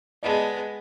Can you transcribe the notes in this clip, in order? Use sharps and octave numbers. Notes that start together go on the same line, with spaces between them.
G#3 B3 D5 D#5 A5